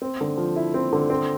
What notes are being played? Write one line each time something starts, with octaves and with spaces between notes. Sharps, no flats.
C4
D3
F3
E4
C4
D3
C4